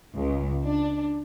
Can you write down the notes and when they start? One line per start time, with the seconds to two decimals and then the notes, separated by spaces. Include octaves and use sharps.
0.17 C#2
0.66 D4